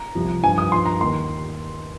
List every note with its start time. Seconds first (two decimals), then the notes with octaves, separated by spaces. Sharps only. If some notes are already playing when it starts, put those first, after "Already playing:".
Already playing: A#5
0.15 C2 C3 F3
0.43 G2 F3 G#5
0.58 D#6
0.72 G2 F3 C6
0.85 A#5
1.00 D#2 D#3 C6